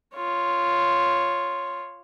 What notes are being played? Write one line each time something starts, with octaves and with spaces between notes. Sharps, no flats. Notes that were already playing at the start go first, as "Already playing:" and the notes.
F4 C#5